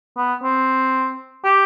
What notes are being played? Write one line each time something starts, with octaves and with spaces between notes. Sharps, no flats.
B3
C4
G4